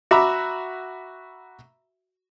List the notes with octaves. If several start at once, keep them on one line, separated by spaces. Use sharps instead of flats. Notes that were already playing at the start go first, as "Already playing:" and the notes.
F#4 E5 A#5 B5 D6 E6